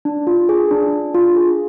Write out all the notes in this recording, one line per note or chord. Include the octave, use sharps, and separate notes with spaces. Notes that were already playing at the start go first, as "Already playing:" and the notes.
D4
F4
G#4
D4
D4
F4
G#4